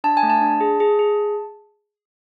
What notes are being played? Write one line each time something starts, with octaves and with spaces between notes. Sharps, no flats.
D4 A5
G#5
A3
A5
D4
G#4
G#4
G#4